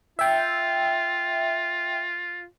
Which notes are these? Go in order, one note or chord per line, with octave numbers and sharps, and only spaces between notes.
F4 E5 G5